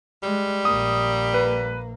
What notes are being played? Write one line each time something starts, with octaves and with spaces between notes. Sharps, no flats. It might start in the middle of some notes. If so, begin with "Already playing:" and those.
G3 G#3
A#1 A#3 D#6
B4